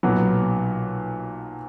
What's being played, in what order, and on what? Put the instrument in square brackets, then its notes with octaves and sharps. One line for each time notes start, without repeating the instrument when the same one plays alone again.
[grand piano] B1 A#2 F#3 B3